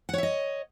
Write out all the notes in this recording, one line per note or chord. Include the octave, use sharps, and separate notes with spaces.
C#5 D#5 E5 F#5